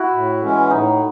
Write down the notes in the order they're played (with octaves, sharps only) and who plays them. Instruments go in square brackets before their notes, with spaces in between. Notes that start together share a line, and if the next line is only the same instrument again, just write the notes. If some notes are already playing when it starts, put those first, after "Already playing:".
Already playing: [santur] E4 F#4
[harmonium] A2
E3 G#3 C#4
[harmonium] A2 [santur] D#4